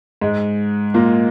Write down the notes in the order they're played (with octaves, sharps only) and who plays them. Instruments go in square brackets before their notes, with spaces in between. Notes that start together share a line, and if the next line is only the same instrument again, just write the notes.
[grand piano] G#2 G#3
A#2 A#3